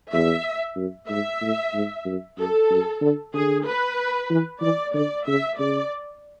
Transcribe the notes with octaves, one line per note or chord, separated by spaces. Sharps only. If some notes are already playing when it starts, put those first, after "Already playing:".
E2 E5
F#2
G#2 E5
A2
G#2
F#2
F#2 A4
F#2
D3
D3 G#4
B4
E3
E3 D5
D3 D5
C#3 E5
C#3 D5